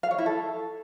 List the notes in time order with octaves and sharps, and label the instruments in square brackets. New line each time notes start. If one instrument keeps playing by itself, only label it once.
[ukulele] F5
C#5
E4
A4